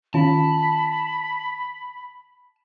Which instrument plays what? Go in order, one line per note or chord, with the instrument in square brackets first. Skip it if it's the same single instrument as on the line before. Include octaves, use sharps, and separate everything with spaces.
[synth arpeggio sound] D#3 C#4 F4 [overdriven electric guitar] A5 [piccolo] B5